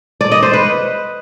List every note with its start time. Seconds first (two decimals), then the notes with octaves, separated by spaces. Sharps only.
0.21 D5
0.32 D#5
0.43 C5
0.53 B4